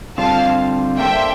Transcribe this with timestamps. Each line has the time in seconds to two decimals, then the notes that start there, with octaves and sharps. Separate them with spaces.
0.18 D3 G3 C4 F4 F5 A5
0.99 A#3 D4 A4 C5 E5 G5